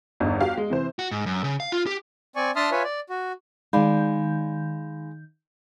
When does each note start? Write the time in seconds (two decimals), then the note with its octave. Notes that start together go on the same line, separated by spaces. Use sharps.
0.20 G1 E2 G2 D#4
0.41 F#4 G4 F5
0.58 G#3
0.70 C3 E3 C5
0.99 F#4
1.11 G#2
1.26 F#2
1.44 C#3
1.60 F5
1.72 F4
1.86 G4
2.36 C4 D5 G#5 C#6
2.56 D4 E5 A5 C6 D#6 F6
2.71 F4 B4 C#5 E5 G#5
2.83 D5
3.10 F#4
3.73 D#3 G#3 D#4 D5 F5 B5 G6